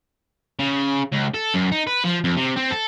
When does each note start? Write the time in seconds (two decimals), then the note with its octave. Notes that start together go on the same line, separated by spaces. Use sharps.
0.59 C#3
1.12 C#2
1.34 A4
1.54 F#2
1.72 D#4
1.87 B4
2.04 F3
2.24 F2
2.37 C3
2.56 C4
2.71 A4